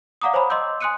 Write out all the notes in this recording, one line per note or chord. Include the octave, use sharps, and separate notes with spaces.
D5 F5 F#5 A#5 D6 D#6
C5 C#5 G#5 A#5 B5
D#5 C6 D6 E6 G6
G#5 C6 D#6 F#6 C#7 D#7